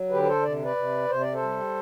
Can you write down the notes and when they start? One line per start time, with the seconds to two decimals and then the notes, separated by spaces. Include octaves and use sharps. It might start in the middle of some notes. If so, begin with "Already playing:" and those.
Already playing: F#3
0.10 D3 G4 B4
0.23 B4
0.27 A4 C5
0.43 C3 D5
0.64 B4 D5
0.76 C3
1.09 C3 C5
1.21 D5
1.33 A4 C5
1.42 G3